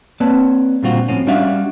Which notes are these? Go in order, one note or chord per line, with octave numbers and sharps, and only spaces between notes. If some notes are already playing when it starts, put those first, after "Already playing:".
A#3 C4 B4 C#5 D5 A5
A#2 D3 G3 C4 F4 F#4
A2 F3 C4 C#4
G3 C#4 D4 F#4 E5 F5